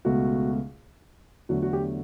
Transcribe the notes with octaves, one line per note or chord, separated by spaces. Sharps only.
C#2 B2 A3 F#4
E2 D3 F#3 A3 F#4
F#4
G4